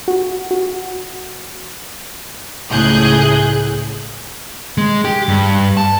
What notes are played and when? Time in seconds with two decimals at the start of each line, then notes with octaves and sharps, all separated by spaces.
0.08 F#4
0.51 F#4
2.69 C#2 A2 G#4 F#6 G6
4.78 G#3
5.05 G4
5.28 G2
5.77 A5